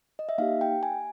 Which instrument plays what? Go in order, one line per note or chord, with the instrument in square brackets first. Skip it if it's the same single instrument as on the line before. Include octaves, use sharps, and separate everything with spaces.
[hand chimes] D#5
E5
A#3 D#4 G4 F5
G5
G#5